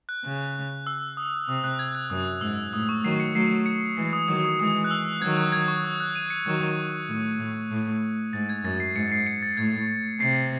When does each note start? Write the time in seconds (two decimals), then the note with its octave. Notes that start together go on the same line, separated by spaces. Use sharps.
0.09 F#6
0.24 C#3
0.87 E6
1.17 D#6
1.48 C3 D#6
1.64 F#6
1.79 G#6
1.95 F#6
2.10 F#2 D#6
2.41 G#2 E6
2.73 A2 D#6
2.89 C#6
3.04 D#3 F#3 C7
3.20 C#7
3.35 F#3 A3 C7
3.66 C#7
3.97 E3 G#3 C7
4.13 D#6
4.28 D#3 F#3 D#6
4.45 D#6
4.59 E3 G#3 D#6
4.84 F#6
4.91 E6
5.22 D#3 F#3 G#6
5.37 F#6
5.52 G#6
5.68 C#6
5.84 D#6
6.00 F#6
6.15 D#7
6.30 C#7
6.46 D#3 F#3
7.09 A2
7.39 A2
7.71 A2
8.33 G#2 A6
8.49 G#6
8.64 F#2 A6
8.80 C7
8.95 G#2 C#7
9.12 C7
9.27 C#7
9.42 A6
9.57 A2 G#6
10.20 C3 C7